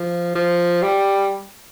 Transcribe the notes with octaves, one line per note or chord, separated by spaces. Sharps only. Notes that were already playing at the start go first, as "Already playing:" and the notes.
Already playing: F3
F3
G3